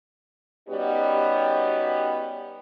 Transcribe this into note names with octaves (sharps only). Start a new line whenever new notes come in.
G3 B3 C#4 D#4 F#4 G4